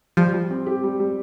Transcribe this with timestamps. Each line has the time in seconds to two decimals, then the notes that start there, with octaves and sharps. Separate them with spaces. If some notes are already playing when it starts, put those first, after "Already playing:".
0.17 F3 G3
0.34 G3
0.50 C4
0.67 G4
0.84 G3
1.00 G3